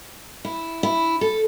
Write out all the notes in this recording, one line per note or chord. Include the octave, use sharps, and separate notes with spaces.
E4
E4
A4